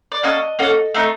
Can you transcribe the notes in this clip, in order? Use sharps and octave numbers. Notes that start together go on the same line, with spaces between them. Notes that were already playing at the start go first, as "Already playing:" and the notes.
D5
A#3 C#4 F#4 A4 D#5
A#3 C#4 F#4 A4
A3 C4 D#4